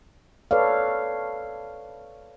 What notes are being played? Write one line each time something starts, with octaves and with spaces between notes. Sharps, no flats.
A4 B4 C#5 D5 F5